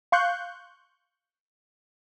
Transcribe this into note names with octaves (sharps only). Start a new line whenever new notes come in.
F5 C6 C#6 F#6 G6